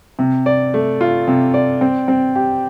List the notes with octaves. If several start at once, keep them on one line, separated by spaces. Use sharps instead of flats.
C3
D5
A3
F4
C3
D5
C4
C4
G4